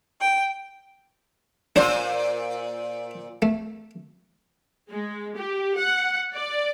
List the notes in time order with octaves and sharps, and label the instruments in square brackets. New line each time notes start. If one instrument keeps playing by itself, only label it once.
[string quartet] G5
[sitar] A#2 C5 [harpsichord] D4
[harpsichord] A3
[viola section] G#3
G4
F#5
D5